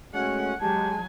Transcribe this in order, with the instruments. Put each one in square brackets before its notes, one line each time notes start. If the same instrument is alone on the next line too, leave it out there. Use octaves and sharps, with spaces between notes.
[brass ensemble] G#3 A3 C#4 [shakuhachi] F#4 [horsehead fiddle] F#5
[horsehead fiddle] F#3 G#5 [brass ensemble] G#3 [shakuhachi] G4 [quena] A5